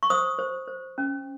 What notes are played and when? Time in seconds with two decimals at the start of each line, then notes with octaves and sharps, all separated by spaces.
0.03 C#6
0.10 C5 D#6
0.39 C5
0.68 C5
0.98 C#4